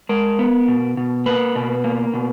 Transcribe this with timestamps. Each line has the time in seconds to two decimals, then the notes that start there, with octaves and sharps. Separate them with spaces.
0.09 G#3 A#4
0.39 B3
0.68 B2
0.97 B2
1.26 A#3 B4
1.56 B2
1.84 A#3
2.14 B2